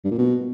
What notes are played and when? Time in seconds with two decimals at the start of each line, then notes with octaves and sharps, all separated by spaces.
0.05 G2
0.11 A#2
0.18 B2